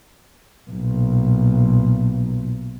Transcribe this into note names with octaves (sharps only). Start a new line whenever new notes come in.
B1 A#2